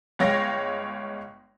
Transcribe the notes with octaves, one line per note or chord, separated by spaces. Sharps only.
G1 G#3 C#5 F5 G5 A#6